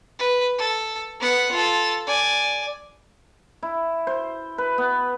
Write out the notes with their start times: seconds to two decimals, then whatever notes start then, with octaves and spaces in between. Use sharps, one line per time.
0.19 B4
0.59 A4
1.21 B3 F#5
1.52 F4 A4
2.07 D5 G#5
3.63 E4
4.07 C5
4.58 B4
4.78 B3